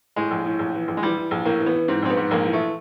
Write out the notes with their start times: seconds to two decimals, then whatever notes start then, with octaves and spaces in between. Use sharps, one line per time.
0.16 A2 G#3
0.31 A#1
0.46 A2
0.59 A#1
0.74 E3
0.88 A#1
0.97 G#3
1.03 E3 G3
1.17 E3
1.31 A#1
1.45 A2 A#3
1.60 E3
1.66 B3
1.74 E3
1.88 G#2 C4
2.03 A#1 C4
2.10 B3
2.17 G#2
2.31 A#1 A#3
2.46 E3
2.53 A3